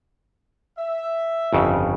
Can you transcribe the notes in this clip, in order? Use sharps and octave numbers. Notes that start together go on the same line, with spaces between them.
E5
G1 F2 C#3